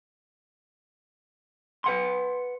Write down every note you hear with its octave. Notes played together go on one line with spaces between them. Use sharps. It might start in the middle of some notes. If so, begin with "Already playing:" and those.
B4 F#5 C6